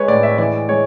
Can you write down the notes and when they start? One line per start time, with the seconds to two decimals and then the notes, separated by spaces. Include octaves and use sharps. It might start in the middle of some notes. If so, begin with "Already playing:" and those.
Already playing: G#3 B4 C#5
0.08 A2 D5
0.23 E5
0.38 E3 D5
0.69 G#3 C#5